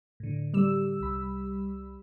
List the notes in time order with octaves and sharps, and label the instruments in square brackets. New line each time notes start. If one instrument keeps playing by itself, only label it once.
[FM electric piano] A2 D3
[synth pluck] G3 E6
[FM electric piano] C2 B5